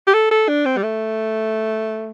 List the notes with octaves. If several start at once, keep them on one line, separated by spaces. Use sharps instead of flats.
G4
A4
A4
D4
C4
G3
A3